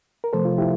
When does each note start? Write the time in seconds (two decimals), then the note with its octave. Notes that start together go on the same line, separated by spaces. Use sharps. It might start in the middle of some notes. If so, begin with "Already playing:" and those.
0.24 A#4
0.33 C3 F3 A3 A4 C5
0.45 F4
0.58 E4 G4